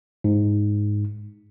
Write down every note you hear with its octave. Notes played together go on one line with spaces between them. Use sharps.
G#2